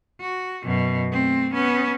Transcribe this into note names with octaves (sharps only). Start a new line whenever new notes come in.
F#4
F#2 B2
A3 C4
B3 C#4